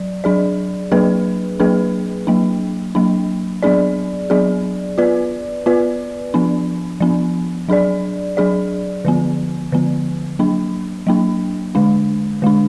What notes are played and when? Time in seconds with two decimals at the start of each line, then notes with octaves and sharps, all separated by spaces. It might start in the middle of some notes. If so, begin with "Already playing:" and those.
Already playing: F#3 D5
0.24 F#3 D4 G#4 D5
0.92 F#3 A#3 D4 G#4 B4
1.60 F#3 A#3 D4 G#4 B4
2.27 F#3 A#3 D4
2.95 F#3 A#3 D4
3.63 F#3 B3 D4 G#4 D5
4.30 F#3 B3 D4 G#4 D5
4.98 B3 F4 B4 D5
5.66 B3 F4 B4 D5
6.34 F3 B3 D4
7.00 F3 B3 D4
7.69 F#3 D4 G#4 D5
8.37 F#3 D4 G#4 D5
9.05 D3 F3 B3
9.72 D3 F3 B3
10.39 F#3 A#3 D4
11.07 F#3 A#3 D4
11.75 D3 G#3 D4
12.42 D3 G#3 D4